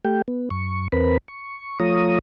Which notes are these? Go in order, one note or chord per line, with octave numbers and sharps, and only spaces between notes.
A3 G4 G5
B3
F#2 C#6
E2 C4 A#4 B4 B5
C#6
F3 A3 F4 C#5 A#5 D#6